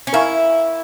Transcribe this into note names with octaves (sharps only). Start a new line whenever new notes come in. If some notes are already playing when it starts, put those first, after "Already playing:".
C#4
E4 A#4 F5 G#5 C#6